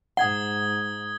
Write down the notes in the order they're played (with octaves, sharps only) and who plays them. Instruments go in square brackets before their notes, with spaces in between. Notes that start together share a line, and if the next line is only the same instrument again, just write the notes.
[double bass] G#2 [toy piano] F#5 [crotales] D#6 G#6 G7